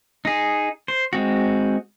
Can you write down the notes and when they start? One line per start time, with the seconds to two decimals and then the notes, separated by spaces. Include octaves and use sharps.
0.25 D#4 G#4
0.88 C5
1.13 G#3 C4 F#4